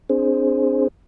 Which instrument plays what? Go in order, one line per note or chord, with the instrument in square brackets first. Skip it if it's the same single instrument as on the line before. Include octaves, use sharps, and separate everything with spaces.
[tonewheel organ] C4 D4 G#4 C5